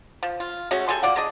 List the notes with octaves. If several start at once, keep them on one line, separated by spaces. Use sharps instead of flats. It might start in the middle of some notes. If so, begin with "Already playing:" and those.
F3
F4
G#3 A3 C#4 F#4
G3 A4 G#5 C6
F4 D5 F#5
G#3 D4 D#5